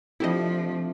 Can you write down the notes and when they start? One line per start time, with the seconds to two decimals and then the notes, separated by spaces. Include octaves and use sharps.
0.20 C3 F3 A3 D4 E4 G4 D#5